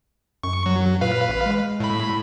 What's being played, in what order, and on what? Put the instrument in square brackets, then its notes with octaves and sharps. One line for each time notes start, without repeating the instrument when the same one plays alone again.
[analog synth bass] F#2 [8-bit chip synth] C#6
[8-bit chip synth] F#3
[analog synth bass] A#2 [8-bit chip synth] B4 F5
[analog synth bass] A1
G#3
[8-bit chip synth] A2 B5